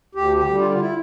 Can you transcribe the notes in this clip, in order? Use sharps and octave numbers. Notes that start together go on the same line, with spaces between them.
D2 G4
G4
D3 G3
F4
F4
E4